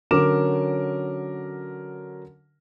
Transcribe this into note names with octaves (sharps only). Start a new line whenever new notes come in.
D3 F#3 C#4 A#4 D6 E7